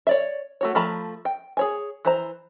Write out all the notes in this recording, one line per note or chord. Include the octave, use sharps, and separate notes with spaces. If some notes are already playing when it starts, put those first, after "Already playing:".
C#5 D5 E5
A3 F#4 C#5
F3 A3 A#5 B5
G5
G#4 C#5 G#5
E3 C5 A#5